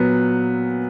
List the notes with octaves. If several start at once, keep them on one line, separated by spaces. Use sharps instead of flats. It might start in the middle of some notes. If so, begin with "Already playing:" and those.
Already playing: A#2 F#3 B3